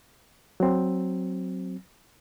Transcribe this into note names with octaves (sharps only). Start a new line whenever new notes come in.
F#3 C4